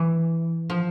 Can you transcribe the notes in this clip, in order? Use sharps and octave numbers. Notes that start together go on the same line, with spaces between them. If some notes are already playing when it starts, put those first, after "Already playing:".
Already playing: E3
F3